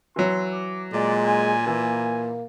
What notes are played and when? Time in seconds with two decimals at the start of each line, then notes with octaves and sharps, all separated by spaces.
0.16 E3 F#3 C6
0.53 D6
0.93 A#2 G#3 D5
1.25 G#5
1.67 E3 A#3 G#5